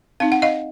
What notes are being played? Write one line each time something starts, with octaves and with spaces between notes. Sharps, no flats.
C4 D#4 F5
F#5
D#5 F5